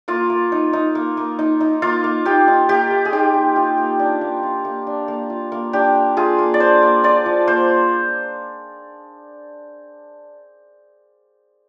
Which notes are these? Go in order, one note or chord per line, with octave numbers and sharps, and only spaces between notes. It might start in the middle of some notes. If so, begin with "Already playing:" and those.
A#3 F4
A#3
D#4
D#4
A#3
A#3
D#4
D#4
A#3 F4
A#3
D#4 G4
D#4
A#3 G4
A#3
G#4
D#4 G4
D#4
F4
A#3
D4
A#3
F4
A#3
D4
A#3
F4
A#3
D4 G4
A#3
F4 G#4
A#3
D5
D4 C5
A#3
F4 D5
F3
A#3 C5